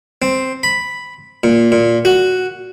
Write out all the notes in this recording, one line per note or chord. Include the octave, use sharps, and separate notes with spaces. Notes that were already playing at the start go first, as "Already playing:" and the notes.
C4
B5
A#2
A#2
F#4